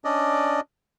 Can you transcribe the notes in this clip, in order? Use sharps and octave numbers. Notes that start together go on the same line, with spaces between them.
C#4 D4 D5 D#5